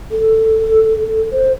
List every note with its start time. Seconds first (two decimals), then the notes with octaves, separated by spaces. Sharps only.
0.11 A4
1.32 C5